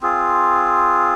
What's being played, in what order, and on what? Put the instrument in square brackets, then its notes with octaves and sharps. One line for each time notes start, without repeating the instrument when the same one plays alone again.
[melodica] C4 F4 G#4